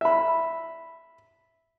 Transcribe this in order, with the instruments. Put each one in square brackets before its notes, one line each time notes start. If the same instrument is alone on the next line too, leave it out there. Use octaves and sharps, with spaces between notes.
[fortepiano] E5 B5